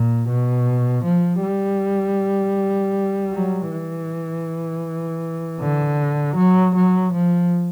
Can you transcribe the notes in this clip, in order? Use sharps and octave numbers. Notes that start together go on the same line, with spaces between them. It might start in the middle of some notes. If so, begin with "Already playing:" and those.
Already playing: A#2
B2
F3
G3
F#3
E3
D3
F#3
F#3
F3